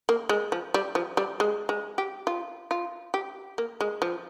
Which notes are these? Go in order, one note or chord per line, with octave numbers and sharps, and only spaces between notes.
A#3
G#3
F3
G3
F3
G3
G#3
G#3
G4
F4
F4
G4
A#3
G#3
F3